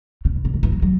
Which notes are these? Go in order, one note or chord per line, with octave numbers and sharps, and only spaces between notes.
C#3
B2
C#3
D#3
E3
F#3
F#3